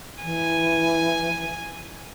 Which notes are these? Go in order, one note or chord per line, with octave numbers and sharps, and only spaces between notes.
E3 G#5